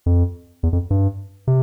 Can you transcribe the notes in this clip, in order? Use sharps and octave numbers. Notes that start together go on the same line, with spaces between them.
F2
E2
F2
G2
C3